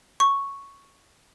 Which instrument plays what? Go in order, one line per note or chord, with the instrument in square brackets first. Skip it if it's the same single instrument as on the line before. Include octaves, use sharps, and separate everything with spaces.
[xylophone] C#6